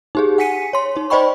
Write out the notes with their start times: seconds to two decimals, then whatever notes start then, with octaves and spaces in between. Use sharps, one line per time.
0.15 D#4 G4 G#4
0.38 F#5 G#5 B6 C#7 D#7
0.73 C#5 C6
0.96 D#4 C#5
1.10 C5 D5 D#5 G5 B5 C#6